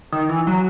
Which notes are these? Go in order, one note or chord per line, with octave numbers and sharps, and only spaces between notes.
D#3
E3
F#3